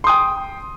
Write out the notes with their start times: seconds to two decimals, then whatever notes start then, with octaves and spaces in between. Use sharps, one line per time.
0.04 C6
0.07 D#6
0.09 G5